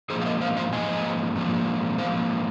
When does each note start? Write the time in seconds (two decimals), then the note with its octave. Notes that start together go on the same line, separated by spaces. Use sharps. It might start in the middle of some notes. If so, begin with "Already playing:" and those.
0.10 G#2 F3 A#3 G#4 C5
0.22 F5
0.26 A#4 D#5
0.41 C5 F5
0.57 C5 F5
0.73 G#2 F3 A#3 D#5 G#5
1.36 G#2 F3 A#3
1.98 G#2 F3 A#3 C5 F5